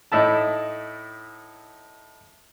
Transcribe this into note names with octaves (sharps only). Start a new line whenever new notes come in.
A2 D#4 E4 A5